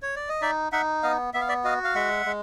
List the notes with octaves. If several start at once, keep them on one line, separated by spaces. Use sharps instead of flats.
C#5
D5
D#5
D#4 D5 E5
D#4 E5 F#5
B3 D#5 F5
B3 E5
F5
D5 E5
F#4 D#5 F5
F5
G#3 E5 F#5
G#3